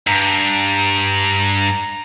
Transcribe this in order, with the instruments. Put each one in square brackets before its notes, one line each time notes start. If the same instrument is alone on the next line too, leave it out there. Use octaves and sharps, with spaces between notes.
[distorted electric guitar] G2 [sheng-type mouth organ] A#5